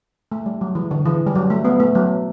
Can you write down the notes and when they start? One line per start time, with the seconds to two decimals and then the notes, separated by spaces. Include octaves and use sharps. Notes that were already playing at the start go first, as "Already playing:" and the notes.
0.32 A3
0.46 G3
0.61 F#3
0.75 E3
0.91 D3
1.06 E3
1.27 G3
1.35 F#3
1.50 A3
1.65 B3
1.80 A3
1.95 F#3